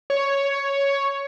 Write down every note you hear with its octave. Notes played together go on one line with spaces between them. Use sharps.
C#5